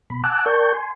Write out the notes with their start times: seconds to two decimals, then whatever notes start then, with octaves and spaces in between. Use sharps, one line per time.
0.10 B2 B5
0.24 F#5 G#5 A5 D6 E6 F#6
0.46 A#4 D5 G5 A5 C#6 G6
0.74 G#5 C6